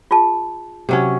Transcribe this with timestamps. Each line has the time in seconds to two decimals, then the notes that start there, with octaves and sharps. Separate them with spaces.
0.11 F4 G#4 A5
0.89 C3 F#3 C#4